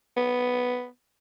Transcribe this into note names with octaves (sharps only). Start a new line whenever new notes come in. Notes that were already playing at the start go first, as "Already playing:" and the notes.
B3